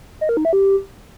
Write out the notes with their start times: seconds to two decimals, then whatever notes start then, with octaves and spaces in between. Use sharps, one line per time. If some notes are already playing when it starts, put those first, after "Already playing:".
0.21 D#5
0.29 A#4
0.37 D#4
0.45 E5
0.53 G4